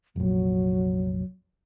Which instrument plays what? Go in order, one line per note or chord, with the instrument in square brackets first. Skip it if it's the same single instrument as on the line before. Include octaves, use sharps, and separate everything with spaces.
[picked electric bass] F1 A#1 [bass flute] F#3